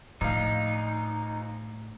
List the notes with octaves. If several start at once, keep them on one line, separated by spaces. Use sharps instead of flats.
A#1 A2 D#4 F5